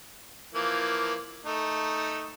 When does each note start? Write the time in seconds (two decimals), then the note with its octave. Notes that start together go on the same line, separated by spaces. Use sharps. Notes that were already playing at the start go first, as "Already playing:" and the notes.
0.54 E3 F3 A#3
1.46 A3 D#4